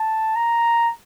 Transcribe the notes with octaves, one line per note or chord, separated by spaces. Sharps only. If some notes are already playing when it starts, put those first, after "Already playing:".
Already playing: A5
A#5